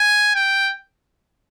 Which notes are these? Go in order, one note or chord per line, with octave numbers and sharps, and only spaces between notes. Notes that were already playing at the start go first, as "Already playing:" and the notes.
Already playing: G#5
G5